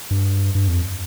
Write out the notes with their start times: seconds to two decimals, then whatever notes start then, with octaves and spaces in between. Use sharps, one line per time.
0.11 G2
0.55 G2
0.68 F2